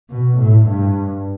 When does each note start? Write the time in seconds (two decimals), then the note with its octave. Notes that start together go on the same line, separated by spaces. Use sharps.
0.10 B2
0.38 A2
0.66 G2